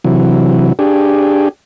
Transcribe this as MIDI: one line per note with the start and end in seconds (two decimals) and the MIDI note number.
0.04 0.73 48
0.04 0.73 52
0.04 0.73 54
0.79 1.49 62
0.79 1.49 67
0.79 1.49 68